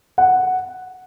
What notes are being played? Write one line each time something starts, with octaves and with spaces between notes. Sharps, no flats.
F#5